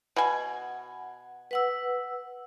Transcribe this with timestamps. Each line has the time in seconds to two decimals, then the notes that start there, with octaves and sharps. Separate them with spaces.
0.16 B2 F#5 G#5
1.51 B4 F#5 E6